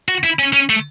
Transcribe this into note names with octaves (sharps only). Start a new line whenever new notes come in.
F#4
E4
C#4
C#4
A3